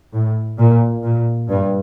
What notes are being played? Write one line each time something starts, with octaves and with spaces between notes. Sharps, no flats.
A2
A#2
A#2
G2